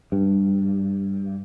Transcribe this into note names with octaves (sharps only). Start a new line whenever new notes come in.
G2